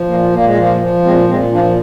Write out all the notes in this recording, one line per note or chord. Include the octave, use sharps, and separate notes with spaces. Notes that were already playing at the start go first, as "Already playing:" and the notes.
Already playing: F3
A#2 A#3
A#2 A#3
G#3
F3 A#3
F3
A#2 G#3 C4
A#2 G#3 C4
F3 A#3 D4